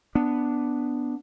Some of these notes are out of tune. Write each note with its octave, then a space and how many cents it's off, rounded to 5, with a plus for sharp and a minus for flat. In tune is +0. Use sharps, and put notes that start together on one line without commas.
B3 +0 D4 +0